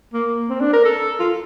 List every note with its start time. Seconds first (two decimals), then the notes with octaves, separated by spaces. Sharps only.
0.13 A#3
0.50 C4
0.61 D4
0.73 A#4
0.85 A4
1.19 F4